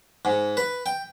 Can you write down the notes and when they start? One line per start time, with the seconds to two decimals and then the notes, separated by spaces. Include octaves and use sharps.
0.25 G#2
0.57 B4
0.86 G5